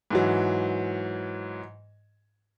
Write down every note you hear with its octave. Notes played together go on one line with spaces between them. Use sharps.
G#2 E3 F#3